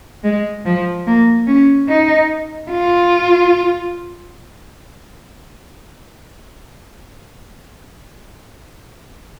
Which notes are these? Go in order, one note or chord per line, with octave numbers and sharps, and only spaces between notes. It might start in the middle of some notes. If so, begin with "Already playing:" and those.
G#3
F3
A#3
C#4
D#4
F4